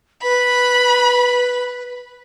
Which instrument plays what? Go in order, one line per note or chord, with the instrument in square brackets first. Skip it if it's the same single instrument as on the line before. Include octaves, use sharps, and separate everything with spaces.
[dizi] B4 [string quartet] B5